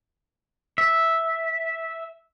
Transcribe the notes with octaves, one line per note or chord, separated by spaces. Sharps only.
E5